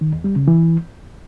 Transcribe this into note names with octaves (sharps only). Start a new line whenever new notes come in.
D#3
E2
G3
C#3
E3